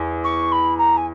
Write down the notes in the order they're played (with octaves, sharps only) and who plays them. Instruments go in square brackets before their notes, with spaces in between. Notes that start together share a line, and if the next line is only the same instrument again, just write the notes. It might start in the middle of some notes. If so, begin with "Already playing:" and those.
Already playing: [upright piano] E2
[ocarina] C#6
B5
A#5
G#5